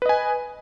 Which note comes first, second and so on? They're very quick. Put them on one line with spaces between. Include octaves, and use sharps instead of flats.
B4 D#5 G#5